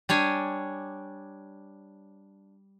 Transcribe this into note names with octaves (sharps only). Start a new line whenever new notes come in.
G3 D4 C#5 G#5